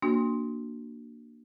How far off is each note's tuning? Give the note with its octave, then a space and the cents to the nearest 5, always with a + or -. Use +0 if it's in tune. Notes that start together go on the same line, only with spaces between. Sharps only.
A#3 +0 D4 +5 F#4 +0